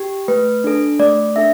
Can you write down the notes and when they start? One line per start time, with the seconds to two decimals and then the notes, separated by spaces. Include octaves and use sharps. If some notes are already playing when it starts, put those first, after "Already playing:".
Already playing: G4
0.28 A3 B4
0.64 D4 A4
1.00 A3 D5
1.36 D4 A4 E5